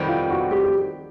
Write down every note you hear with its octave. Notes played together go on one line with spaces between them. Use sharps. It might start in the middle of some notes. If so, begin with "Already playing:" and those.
Already playing: F2 C3 D#3 G3 B3
F4
F#4
G4
G4